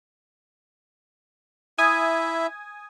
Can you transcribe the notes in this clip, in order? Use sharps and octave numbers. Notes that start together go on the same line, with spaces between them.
E4 E5 G#5 D#6